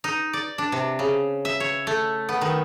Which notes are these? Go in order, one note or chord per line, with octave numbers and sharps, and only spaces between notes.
D#4
D5
D4
C3
C#3
E5
C#5
A3
B3
D#3